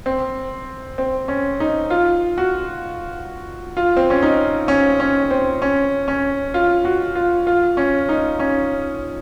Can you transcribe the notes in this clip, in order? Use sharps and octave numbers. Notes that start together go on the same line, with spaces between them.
C4
C4
C#4
D#4
F4
F#4
F4
C4
C#4
D#4
C#4
C#4
C4
C#4
C#4
F4
F#4
F4
F4
C#4
D#4
C#4